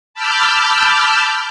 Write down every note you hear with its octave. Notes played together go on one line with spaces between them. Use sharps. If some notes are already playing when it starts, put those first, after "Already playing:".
A5 B5 D6 E6 F6 G6